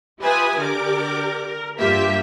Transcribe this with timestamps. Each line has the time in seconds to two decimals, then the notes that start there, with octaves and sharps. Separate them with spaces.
0.21 F4 G4 B4 E5 G#5 D#6
0.57 D3 G4 A#4 D5 D6
1.47 A#4
1.79 G2 A#3 F4 G4 E5 B6